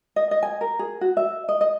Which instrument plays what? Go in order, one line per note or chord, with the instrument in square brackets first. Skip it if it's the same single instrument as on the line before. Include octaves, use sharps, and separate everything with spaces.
[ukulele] D#5
D#5
G#5
A#4
G#4
F#4
E5
D#5
D#5